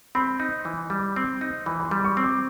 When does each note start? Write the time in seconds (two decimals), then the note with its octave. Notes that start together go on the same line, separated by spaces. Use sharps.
0.15 C4 B5
0.40 D#4
0.65 E3
0.90 G3
1.16 C4
1.41 D#4
1.66 E3 B5
1.80 B5
1.85 C6
1.91 G3
2.05 C#6
2.17 C4
2.23 D6